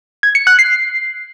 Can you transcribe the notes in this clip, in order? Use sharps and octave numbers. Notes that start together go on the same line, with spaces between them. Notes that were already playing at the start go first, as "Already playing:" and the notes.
G#6
C#7
F#6
C7